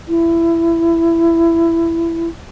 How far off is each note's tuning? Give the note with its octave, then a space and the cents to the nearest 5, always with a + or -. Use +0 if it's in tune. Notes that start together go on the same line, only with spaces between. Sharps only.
E4 +15